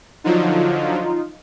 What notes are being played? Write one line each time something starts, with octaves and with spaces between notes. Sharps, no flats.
D3 F3 F#3 D#4 F4